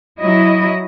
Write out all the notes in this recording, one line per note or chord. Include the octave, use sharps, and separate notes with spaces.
F#3 E4 D#5